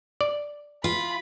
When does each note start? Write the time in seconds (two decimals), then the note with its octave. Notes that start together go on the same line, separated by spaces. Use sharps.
0.21 D5
0.84 F4 B5